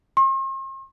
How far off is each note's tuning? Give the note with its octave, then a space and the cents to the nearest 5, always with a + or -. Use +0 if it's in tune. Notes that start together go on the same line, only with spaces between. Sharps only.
C6 +45